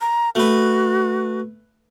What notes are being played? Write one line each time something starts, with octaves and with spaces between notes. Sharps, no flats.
A#5
A3 F#4 B4